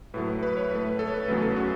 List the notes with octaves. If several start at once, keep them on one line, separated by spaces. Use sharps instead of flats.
A2 F#3 A3 B4
B4
B4
C#5
A2 A3 B4
B4
A4
C#5
B4
E2 C#3 F#3 A3 B4
A4
F#4